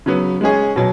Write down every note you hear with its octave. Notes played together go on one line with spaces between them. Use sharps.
C#3 F#3 B3
G#3 C#4 G#4
B2 F#3